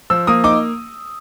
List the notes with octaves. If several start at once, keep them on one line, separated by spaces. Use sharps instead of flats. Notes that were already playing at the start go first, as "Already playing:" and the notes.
F3 E6
A#3 D#6
D#4 D6